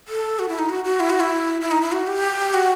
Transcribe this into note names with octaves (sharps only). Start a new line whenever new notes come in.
A4
F#4
E4
D#4
F#4
F#4
E4
F#4
E4
E4
D#4
E4
F#4
G4
F#4